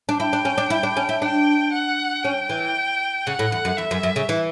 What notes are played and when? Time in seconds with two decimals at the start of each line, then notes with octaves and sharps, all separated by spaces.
0.09 D4
0.19 E4 G5
0.33 D4
0.45 C#4
0.58 D4
0.70 E4
0.83 D4
0.97 C#4
1.09 E4
1.22 D4 G5
1.73 F#5
2.24 C#4 G5
2.50 E3
3.27 C#3 F#5
3.39 A2
3.52 E2
3.65 F#2
3.77 E2 E5
3.91 F#2
4.03 F#2
4.16 C#3
4.29 E3